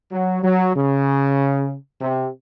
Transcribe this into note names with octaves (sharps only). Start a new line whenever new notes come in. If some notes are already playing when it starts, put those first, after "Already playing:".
F#3
F#3
C#3
C3